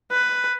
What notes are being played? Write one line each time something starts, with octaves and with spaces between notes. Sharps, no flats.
B4